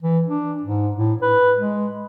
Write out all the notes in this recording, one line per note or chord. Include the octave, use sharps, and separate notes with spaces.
E3
D4
G#2
A2
B4
G#3